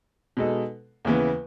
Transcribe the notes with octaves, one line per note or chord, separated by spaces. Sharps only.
B2 G#3 D#4 A4
D#2 C#3 E3 B3